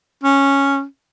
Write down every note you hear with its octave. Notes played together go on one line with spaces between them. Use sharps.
C#4